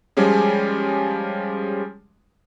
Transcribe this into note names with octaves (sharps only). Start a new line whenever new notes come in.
F3 G3 G#3 C#4 G#4